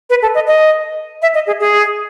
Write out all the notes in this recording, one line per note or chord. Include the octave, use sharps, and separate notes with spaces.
B4
A4
D#5
D#5
E5
D#5
G#4
G#4